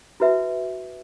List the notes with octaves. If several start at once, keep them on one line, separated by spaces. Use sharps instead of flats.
E4 F#4 B4 E5